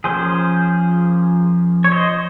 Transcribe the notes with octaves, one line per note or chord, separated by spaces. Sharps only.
F3 A#3 C#4 G#4 C5
C#5
C5 D#5